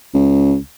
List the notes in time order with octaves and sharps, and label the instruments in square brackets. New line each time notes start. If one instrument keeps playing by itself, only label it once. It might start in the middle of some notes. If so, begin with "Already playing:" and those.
[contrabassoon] C#2